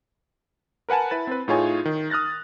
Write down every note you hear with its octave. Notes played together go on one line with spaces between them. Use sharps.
A#4 B4 F#5 G#5 A5
E4 B4 A6
C4 B4
A2 D#4 F4 G#4 C#5 G#5
D#3
D#6 F6 F#6 A6 A#6